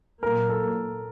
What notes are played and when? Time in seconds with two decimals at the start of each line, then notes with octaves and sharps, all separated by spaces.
0.22 A#2 F#3 A#3 A#4
0.50 A4